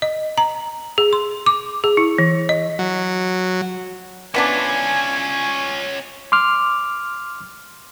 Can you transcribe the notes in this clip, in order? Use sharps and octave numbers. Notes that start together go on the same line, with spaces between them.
D#5
A#5
G#4
C6
D6
G#4
E4
E3
D#5
F#3
E3 B3 C#4 D4 F4 G#5
C6 D6 F6